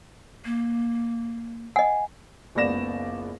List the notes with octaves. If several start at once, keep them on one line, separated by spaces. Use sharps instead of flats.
A#3
D#5 F#5 G#5
F#1 C#2 B3 D5 A#6 E7